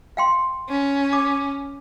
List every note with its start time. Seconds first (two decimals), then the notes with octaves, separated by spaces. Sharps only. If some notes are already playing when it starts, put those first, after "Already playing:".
0.17 F5 G5 C6
0.69 C#4
1.13 D6